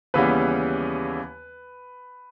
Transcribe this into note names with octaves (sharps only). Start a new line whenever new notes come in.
D#2 C#3 E3 G3 B3 B4